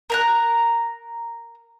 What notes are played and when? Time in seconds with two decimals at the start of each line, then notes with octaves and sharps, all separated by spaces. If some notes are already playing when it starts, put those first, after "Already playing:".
0.10 A#4 A#5 F#6